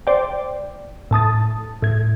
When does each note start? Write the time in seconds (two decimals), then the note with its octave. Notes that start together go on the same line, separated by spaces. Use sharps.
0.07 C5 D5 G5
1.11 A2 A5 D#6 A6
1.82 A2 G#6